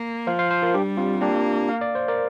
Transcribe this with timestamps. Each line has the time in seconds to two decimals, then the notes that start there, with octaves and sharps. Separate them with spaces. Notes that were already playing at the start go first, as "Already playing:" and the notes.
Already playing: A#3
0.27 F3 C5 F5
0.39 C5 F5
0.51 C5 F5
0.62 F4 A#4
0.74 G3 D4 G4
0.97 C4 F4
1.21 A#3 D4 G4
1.69 F5
1.81 D5
1.95 C5
2.08 A#4 D5